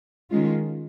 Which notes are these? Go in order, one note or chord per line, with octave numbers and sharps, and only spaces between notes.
D#3 G#3 C#4 F4